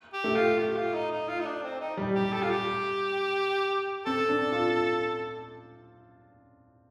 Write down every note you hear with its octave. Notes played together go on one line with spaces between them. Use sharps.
G4
A3
F4
G4
F4
D#4
D#4
F4
D#4
D4
C4
D#4
G3
G4
A4
F4
G4
C4 A4
D4
F4